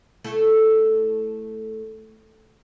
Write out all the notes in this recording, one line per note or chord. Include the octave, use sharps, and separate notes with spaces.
A3 E4 A4